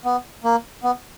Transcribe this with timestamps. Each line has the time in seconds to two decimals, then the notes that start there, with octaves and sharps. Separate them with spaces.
0.05 B3
0.44 A#3
0.83 B3